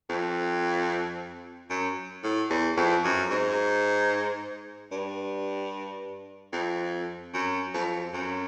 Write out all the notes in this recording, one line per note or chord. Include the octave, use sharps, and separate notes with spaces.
F2
F#2
A2
E2
F2
F#2
G#2
G2
F2
F#2
F2
F#2